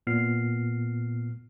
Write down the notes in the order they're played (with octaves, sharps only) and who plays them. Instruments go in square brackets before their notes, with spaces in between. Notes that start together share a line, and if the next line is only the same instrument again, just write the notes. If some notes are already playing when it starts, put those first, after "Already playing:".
[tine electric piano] A#2 B3 F6 C7